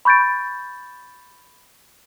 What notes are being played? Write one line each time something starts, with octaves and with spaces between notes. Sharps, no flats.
B5 C#6 G6 A6 D7